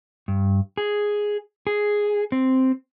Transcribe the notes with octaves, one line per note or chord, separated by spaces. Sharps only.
G2
G#4
G#4
C4